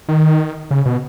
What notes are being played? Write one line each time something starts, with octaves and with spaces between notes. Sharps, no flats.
D#3
C#3
B2